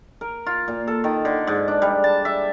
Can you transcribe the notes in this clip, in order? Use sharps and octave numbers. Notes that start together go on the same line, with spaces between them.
A#4
F4
A#2
A4
D#3
D3
G#2
D4
G3
A5
E5